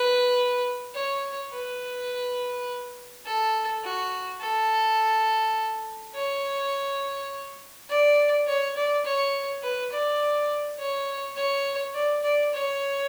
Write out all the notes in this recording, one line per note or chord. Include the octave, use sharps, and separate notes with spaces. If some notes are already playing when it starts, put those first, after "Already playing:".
Already playing: B4
C#5
B4
A4
F#4
A4
C#5
D5
C#5
D5
C#5
B4
D5
C#5
C#5
D5
D5
C#5